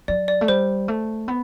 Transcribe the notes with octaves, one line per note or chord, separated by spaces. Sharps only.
F#3 D5
D5
A3
G3 C5
A3
B3